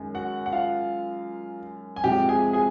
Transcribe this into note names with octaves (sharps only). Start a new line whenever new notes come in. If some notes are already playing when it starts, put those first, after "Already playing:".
Already playing: F#2 D#3 G#3
F#4 F#5
F#5
F4 F5
G#5
F2 C3 F3 G#3 G4 G5
G#4 G#5
G#4 G#5